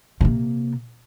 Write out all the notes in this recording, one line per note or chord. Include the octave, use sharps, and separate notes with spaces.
C3 A#3